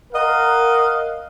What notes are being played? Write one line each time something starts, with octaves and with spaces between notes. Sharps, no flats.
A#4 D#5 F5 F#5